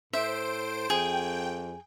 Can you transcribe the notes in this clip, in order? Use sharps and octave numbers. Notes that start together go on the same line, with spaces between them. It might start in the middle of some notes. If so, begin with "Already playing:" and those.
A2 C5 E5 D7
F2 G#4 G5